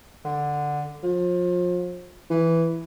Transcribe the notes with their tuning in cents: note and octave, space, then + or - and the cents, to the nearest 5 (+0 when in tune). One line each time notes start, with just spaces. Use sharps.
D3 +0
F3 +30
E3 +0